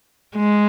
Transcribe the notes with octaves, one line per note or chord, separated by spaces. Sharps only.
G#3